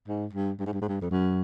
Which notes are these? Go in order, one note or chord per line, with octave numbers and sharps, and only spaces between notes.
G#2
G2
G2
G#2
G2
G#2
G2
F2
F#2